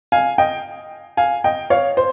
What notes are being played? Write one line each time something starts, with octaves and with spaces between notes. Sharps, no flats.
F5 G#5
D#5 G5
F5 G#5
D#5 G5
C#5 F5
C5